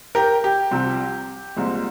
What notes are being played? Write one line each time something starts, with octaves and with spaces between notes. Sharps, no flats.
G4 A#4
G4
C2 C3 F3 C4
C2 A#2 G#3 C4